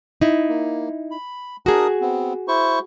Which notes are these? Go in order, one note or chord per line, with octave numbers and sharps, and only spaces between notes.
D#4 E4
A#3
B5
D4 F#4 G#4 A#4 D#6
B3 C4
E4 C5 C#6